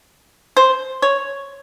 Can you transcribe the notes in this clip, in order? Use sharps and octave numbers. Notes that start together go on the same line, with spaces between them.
C5
C#5